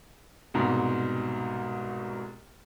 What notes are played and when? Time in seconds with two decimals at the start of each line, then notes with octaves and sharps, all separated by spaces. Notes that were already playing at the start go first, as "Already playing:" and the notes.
0.54 C2 G#2 B2